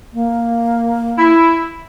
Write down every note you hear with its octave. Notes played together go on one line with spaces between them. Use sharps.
A#3
E4